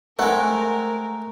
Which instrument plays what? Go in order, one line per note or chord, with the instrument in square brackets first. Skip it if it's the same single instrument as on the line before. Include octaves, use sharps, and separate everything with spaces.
[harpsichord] G#3 A3 [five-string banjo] C4 F#5 [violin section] A#4 [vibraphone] A#5